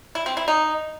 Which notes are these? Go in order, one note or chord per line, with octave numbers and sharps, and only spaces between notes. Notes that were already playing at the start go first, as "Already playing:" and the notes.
E4
C4
E4
D#4